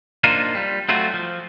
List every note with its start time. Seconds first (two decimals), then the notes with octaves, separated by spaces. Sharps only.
0.24 A#3 D4 D#4 F4 C5
0.55 G3
0.89 F#3 A3 C4 F4 F#4
1.14 F3